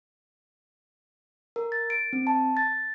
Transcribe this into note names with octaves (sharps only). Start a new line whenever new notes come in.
A#4
A6
D7
C4
A5
A6